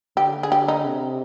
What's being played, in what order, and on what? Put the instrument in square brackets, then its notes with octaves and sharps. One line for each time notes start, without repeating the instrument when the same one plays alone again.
[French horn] D3 [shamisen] G4
[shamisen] G#4
G4
D#4
[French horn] C3